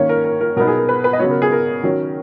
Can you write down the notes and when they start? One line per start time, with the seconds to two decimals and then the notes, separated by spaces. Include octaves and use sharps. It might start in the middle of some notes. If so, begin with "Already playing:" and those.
Already playing: D#3 A#3 C#4 C#5
0.09 A#4
0.25 A#4
0.41 A#4
0.57 B2 F#3 B3 D#4 A#4
0.67 G#4
0.78 A#4
0.89 B4
1.04 B4
1.13 D#5
1.19 C#3 F#3 B3 C#5
1.31 A#4
1.42 G#4
1.52 A#4
1.83 D#3 F#3 C#4